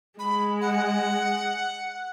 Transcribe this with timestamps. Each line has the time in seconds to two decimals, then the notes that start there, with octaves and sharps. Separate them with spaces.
0.19 G#3 B5
0.61 F#5